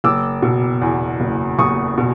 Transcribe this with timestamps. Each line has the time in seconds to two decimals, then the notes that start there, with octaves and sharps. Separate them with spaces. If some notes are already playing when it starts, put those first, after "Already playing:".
0.04 F#1 D6 E6
0.42 B2
0.82 E2
1.20 F#1
1.59 F#1 C#6 D#6
1.98 B2